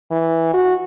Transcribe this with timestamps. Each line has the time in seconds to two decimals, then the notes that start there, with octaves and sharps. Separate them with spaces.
0.11 E3
0.54 F#4